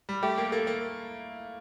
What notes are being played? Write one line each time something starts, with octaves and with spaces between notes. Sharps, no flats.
G3
A3 G4
A#3
A#3 A4
A#3